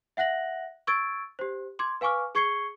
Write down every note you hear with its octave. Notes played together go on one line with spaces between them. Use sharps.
E5 F#5 F#6 A#6 F#7
C#6 E6 G#6 A6 D7
G4 C5
C6 D6 G#6
B4 F5 G#5 C#6 D6 F6
G#4 C#6 G#6 C7 C#7 G7